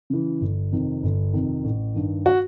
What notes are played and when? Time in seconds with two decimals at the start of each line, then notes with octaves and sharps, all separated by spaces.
0.10 C#3 E3
0.41 G1
0.72 F2 C3 D#3
1.03 G1
1.34 F2 C3 D#3
1.64 A1
1.95 G2 D#3
2.26 F#4